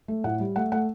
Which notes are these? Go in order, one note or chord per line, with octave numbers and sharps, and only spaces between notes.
A3
A2 F#5
G3
A3 F#5
A3 F#5